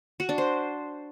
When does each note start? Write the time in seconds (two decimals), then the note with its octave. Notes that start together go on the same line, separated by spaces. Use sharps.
0.20 F#4
0.29 D4
0.38 C5